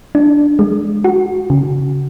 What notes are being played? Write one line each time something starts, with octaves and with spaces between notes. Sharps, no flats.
D4
G#3
F#4
C#3